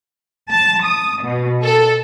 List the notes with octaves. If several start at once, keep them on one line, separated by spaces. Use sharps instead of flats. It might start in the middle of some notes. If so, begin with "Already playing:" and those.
A5
D#6
B2
A4